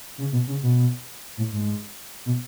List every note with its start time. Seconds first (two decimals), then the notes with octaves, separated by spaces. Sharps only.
0.18 C#3
0.32 B2
0.47 C#3
0.63 B2
1.37 A2
1.52 G#2
2.26 B2